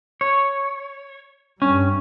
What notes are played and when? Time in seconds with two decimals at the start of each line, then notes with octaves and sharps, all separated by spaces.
0.21 C#5
1.62 G2 G3 C#4